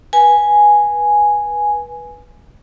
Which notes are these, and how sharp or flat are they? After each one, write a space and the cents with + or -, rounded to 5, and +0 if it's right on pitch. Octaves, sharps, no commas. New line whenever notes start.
B4 -15 G#5 +0